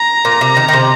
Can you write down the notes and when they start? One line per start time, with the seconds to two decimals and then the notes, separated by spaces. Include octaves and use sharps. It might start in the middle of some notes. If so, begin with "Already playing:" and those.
Already playing: A#5
0.25 A#2
0.41 C3
0.57 D#3
0.68 D#3
0.73 C3